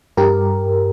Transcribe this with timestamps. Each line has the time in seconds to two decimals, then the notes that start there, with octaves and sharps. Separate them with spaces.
0.17 G2 G4 A#4